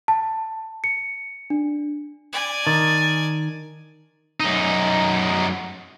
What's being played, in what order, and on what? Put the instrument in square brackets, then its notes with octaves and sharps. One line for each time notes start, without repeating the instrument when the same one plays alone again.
[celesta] A5
C#7
D4
[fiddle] D5 G#5
[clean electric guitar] D#3 [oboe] A5
[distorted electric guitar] F#2 D#4